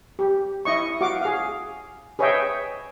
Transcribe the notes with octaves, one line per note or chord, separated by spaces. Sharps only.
G4
E4 D#5 C#6
F#4 F5 D6
G#4 F5
G#4 B4 C#5 D#5 E5 G5